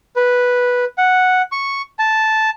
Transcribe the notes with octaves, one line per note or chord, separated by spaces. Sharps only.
B4
F#5
C#6
A5